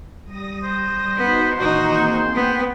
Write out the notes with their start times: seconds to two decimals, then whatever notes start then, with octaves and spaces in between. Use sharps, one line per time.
0.24 G3 D#6 A#6
0.64 C5
1.17 B3 D#4 F#4 B4
1.57 A#2 D#3 E3 D#4 F#4
1.94 A#3 C4 G#4
2.35 B3 F#5 G5